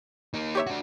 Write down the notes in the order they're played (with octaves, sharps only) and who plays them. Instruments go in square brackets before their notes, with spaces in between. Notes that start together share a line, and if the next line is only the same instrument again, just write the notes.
[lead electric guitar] A#3 D#4
[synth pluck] G4 C#5 E5
[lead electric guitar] D4 F#4